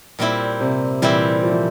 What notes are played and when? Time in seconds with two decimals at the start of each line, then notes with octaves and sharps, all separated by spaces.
0.19 A#2 G3 C4 E4
0.60 C3
1.02 A#2 E3 G3 C4 E4
1.43 F3
1.51 E3